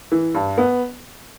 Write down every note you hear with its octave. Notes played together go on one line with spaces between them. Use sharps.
E3
G2
B3